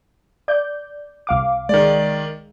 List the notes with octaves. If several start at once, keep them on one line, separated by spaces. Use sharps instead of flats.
D5 G6
C2 F5 D6
D#3 G#3 D5